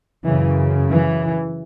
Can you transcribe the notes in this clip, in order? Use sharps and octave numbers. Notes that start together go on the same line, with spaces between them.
F#2 C#3 E3
E3